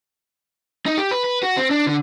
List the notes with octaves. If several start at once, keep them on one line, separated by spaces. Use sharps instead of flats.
D#4
G4
B4
B4
F#4
C4
D4
D3